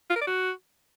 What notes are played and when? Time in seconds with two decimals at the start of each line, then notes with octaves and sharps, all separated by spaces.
0.10 F4
0.16 A#4
0.21 D5
0.27 F#4